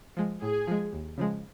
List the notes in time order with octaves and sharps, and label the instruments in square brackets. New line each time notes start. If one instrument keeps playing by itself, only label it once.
[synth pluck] F3 G#3
[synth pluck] A2 [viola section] G#4
[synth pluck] F3 G#3
D#2
C#3 F3 G#3